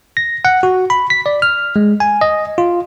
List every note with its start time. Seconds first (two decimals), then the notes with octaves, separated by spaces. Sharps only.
0.17 A#6
0.45 F#5
0.63 F#4
0.90 B5
1.10 B6
1.26 D5
1.42 F6
1.76 G#3
2.00 G#5
2.21 D#5
2.58 F4